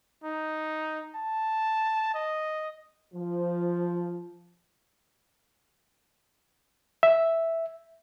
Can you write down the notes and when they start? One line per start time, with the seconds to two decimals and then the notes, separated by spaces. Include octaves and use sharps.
0.24 D#4
1.15 A5
2.15 D#5
3.14 F3
7.03 E5